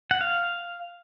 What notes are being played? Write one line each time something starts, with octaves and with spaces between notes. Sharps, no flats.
F#5
F5